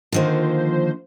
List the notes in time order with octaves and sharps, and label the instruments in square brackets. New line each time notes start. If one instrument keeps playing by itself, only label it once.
[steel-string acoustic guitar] D3 D#3 A#3 [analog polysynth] F3 C5